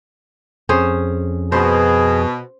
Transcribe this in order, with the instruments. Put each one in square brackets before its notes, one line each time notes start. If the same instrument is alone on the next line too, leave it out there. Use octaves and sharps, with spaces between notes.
[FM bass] F2 [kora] C#4 G#4 C5
[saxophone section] B2 [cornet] G#4 [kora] C5